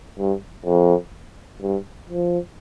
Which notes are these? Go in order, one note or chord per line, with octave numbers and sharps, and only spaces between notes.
G2
F2
G2
F3